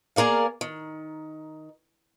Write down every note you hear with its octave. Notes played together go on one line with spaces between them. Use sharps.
A#3 G#4 A#4 D5 F5
D#3